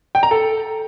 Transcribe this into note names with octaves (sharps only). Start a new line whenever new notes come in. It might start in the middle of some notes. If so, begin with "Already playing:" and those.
G5
A#5
A4